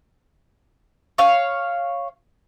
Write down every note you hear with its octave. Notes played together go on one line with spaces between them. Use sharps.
C#5 F5